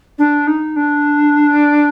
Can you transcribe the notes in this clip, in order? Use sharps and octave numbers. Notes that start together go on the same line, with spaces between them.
D4
D#4
D4